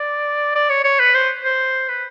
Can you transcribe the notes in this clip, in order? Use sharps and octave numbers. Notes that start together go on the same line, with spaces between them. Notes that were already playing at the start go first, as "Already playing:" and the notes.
Already playing: D5
D5
C#5
C#5
B4
C5
C5
B4